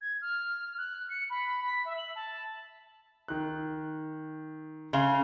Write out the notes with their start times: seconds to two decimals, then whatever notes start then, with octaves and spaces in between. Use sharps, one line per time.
0.01 G#6
0.22 F6
0.78 F#6
1.10 C#7
1.30 B5
1.66 B6
1.85 E5
1.98 F#7
2.16 A5
3.28 D#3 F#6
4.93 C#3 F5 G#5 C6 G7